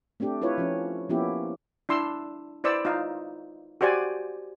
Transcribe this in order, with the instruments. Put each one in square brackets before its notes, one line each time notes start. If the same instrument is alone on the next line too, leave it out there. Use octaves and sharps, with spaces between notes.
[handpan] A3 C4 D4 G4
E4 F4 B4 C#5
F3 C#4
F3 A#3 B3 C#4 E4 G4
[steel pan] D4 E4 C6 E6
E4 B4 C5 D5 E6
D#4 F4 F5
F#4 G4 C5 D5 G#5